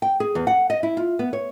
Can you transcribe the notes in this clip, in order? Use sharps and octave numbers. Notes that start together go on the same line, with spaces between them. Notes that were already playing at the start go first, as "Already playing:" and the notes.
G5
G#4
E2
F#5
D#5
E4
F4
B3
C#5